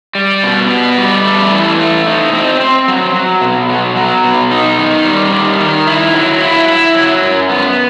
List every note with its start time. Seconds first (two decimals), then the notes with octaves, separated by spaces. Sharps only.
0.15 G3
0.43 B2
0.71 B3
0.98 G3
1.25 A3
1.51 E3
1.79 A3
2.07 D#4
2.33 C4
2.60 C4
2.88 F#3
3.14 F#3
3.41 B2
3.69 F#3
3.96 F#3
4.24 B2
4.51 D#4
4.79 D#3
5.05 G3
5.32 D#3
5.60 D#3
5.87 E4
6.14 F#3
6.41 E4
6.68 E4
6.95 F#3
7.22 F#2
7.49 B3